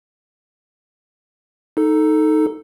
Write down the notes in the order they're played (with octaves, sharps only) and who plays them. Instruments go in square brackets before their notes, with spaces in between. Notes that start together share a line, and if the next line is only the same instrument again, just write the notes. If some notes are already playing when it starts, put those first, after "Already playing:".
[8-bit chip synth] D#4 A4